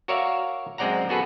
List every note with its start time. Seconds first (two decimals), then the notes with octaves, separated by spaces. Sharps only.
0.08 F#4 A#4 C#5 D5 E5 F5
0.78 F#2 G#3 C4 D5 F#5 A#5
1.09 B3 F#4 G#4 A4 B4